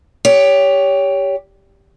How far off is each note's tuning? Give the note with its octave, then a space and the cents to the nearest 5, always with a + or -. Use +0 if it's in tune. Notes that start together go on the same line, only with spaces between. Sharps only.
G4 +15 C#5 +25